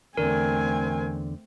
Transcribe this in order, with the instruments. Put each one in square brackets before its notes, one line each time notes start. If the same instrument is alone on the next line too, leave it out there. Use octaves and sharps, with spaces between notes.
[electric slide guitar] E2 D3 D5 [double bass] A3 C4 [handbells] A#4 [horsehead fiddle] G#5